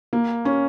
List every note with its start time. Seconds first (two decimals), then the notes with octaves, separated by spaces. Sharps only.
0.13 A#3
0.45 C#4